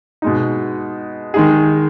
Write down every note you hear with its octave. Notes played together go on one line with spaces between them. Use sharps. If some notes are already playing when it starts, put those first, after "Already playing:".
B2 G#3 D#4
D#3 G#3 D#4 G#4